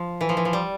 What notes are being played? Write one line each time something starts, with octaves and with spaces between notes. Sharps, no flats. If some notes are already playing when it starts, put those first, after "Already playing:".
Already playing: F3
E3
F3
E3
F3
G3